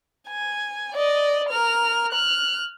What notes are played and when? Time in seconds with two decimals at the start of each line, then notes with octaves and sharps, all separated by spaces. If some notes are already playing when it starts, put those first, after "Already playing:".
0.29 G#5
0.94 D5 D#5
1.49 A#4 F6
2.13 F6 F#6